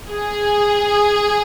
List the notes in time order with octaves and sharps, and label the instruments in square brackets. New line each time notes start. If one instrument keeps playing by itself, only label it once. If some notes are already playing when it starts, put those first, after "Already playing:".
[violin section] G#4